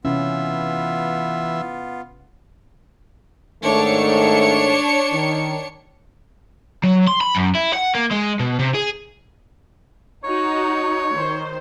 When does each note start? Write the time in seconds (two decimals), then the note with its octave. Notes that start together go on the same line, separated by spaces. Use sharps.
0.05 C3 E3 B3 C#4 F4 E5
3.62 G#2 D#3 A3 D4 C#5 C#7
5.12 D#3
6.83 F#3
7.07 C6
7.21 B5
7.35 F#2
7.55 E4
7.74 F#5
7.95 A#3
8.11 G#3
8.40 B2
8.59 C3
8.74 G#4
10.24 D#4 F#4 C#5
11.12 D#3 C5